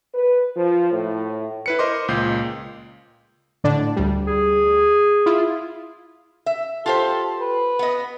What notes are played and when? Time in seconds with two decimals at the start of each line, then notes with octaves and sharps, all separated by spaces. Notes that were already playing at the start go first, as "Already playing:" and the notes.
0.14 B4
0.56 F3
0.92 A2
1.66 E4 B4 C#7
1.79 A#4 C5 D#5 C6 D6
2.08 C#2 A#2 G6 C7
3.64 A2 D3 D4
3.96 D2 G3
4.27 G#4
5.26 E4 F4
6.46 E5
6.86 F4 G4 A4 C5
7.40 B4
7.79 B3 D#5